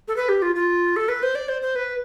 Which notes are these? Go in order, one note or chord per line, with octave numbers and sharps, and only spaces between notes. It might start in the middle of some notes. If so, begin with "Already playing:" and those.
A4
B4
G4
F4
F4
A4
B4
C5
D5
C5
C5
B4